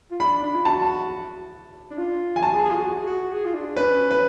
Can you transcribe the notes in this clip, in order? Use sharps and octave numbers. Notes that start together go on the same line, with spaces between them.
F4
D4 B5
D4
F4
F#4 A5
D4
F4
G#5
F#4 A5
G#4
G#4
F4
F#4
F#4
G#4
F#4
G#4
F4
D4
C#4 B4
B4